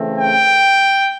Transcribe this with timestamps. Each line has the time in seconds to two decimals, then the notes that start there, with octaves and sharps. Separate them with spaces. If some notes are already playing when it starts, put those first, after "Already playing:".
Already playing: C#3 E3 A3 C4
0.19 G5